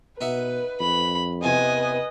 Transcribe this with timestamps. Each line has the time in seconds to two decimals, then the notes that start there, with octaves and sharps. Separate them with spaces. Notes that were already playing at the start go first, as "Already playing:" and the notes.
0.21 B2 D#4 B4 E5 F#5
0.80 F2 B5
1.43 E2 C3 B4 D#5 G#5